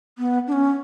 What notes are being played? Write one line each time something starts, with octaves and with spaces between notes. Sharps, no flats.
B3
D4
C#4